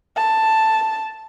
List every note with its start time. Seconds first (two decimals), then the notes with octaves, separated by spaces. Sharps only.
0.17 A5